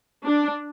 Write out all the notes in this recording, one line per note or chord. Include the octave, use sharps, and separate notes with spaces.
D4